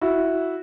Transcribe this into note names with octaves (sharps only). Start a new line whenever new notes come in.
E4 F#4